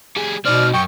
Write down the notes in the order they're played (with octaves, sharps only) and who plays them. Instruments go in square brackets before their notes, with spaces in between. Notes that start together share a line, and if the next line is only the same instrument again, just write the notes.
[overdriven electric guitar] G3 G#4
[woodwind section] B2 [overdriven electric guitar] C4 D#4 [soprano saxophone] D5 [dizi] F6
[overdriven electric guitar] F#2 [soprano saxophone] G5 [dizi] C#6